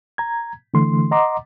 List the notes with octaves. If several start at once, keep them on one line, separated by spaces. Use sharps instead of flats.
A#5 G#6
D3 E3 A3 C6
D#5 F#5 A#5 C6 D6